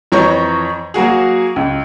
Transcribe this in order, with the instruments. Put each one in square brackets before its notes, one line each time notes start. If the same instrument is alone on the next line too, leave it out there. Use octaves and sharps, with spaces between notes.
[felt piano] F2 E3 C#5 A#5 C#6 G6
F#3 A#3 F#4 G#4
C#2